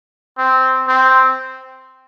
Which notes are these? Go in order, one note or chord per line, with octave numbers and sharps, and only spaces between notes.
C4
C4